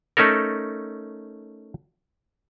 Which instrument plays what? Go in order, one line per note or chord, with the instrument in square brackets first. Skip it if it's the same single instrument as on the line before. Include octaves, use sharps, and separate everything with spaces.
[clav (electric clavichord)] A3 C#4 D#4 A4 A#4